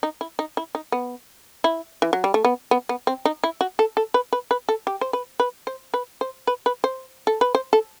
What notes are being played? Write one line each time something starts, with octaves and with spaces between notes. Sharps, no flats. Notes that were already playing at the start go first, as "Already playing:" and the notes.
D#4
E4
D#4
E4
D#4
B3
E4
E3
F#3
G3
A3
B3
B3
B3
C4
D#4
E4
F#4
A4
A4
B4
B4
B4
A4
G4
C5
B4
B4
C5
B4
C5
B4
B4
C5
A4
B4
C5
A4